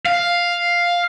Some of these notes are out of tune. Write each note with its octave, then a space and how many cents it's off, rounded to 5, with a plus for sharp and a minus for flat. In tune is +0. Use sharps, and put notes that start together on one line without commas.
F5 +5